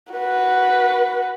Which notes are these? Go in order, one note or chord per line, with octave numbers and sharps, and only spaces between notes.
F#4 B4